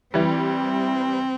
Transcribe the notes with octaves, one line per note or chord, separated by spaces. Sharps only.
E3 G3 C4